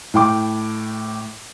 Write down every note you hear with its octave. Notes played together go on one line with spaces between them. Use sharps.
A2 G5 D6